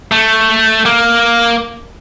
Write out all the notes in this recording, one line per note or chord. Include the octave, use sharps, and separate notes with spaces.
A3
A#3